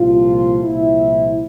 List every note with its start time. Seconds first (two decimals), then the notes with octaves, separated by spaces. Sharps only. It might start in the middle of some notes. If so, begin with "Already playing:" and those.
Already playing: C2 A#2 F3 F4
0.62 C2 A#2 F3 E4